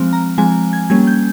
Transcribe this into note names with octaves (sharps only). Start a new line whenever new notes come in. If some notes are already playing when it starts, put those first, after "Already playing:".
Already playing: F3 G#3 C4 F6
A#5
F3 G#3 C4 G#5
G#6
G3 A#3 C#4 G#6
G6